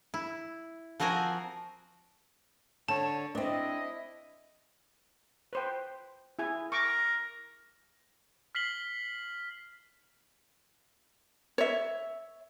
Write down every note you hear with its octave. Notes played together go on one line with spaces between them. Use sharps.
E4
F3 C4 F#4 A#4 G#5
D3 C#5 A5
C4 D4 E4 D#5
B4 C5 G5
E4 G#4 G#5
A#4 C#6 D6
F6 B6 C7 F#7 G7
C#5 E5